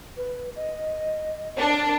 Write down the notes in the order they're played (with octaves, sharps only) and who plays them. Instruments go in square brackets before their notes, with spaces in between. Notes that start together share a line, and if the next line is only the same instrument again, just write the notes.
[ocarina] B4
D#5
[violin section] D4 [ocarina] A#4